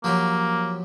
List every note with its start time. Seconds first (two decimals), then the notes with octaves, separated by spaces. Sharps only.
0.04 F3 F#3 A#3 G4